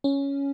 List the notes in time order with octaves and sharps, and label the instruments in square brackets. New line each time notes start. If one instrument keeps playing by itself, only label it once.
[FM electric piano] C#4